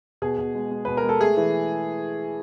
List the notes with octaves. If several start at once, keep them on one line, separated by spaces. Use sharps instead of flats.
B2 G#4
B2
G#3
G#3
B2 B4
A#4
G#3
A4
A3 G#4
E3